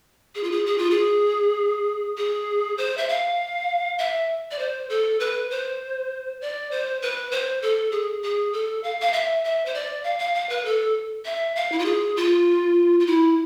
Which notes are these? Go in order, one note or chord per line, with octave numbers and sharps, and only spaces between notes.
G#4
F4
G#4
G#4
F4
G#4
G#4
C5
E5
F5
E5
D5
C5
A4
B4
C5
D5
C5
B4
C5
A4
G#4
G#4
A4
F5
F5
E5
E5
C5
D5
F5
F5
F5
B4
A4
E5
F5
E4
F4
G#4
F4
F4
E4